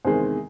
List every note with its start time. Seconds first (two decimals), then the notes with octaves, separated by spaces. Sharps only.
0.05 E2 C3 D#3 G#3 C5